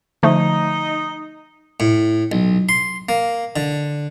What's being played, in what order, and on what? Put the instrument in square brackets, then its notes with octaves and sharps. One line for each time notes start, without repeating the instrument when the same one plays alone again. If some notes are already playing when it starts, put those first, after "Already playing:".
[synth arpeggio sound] D3 F3 A3 [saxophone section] D#4
[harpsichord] A2
B1
C6
A#3
D3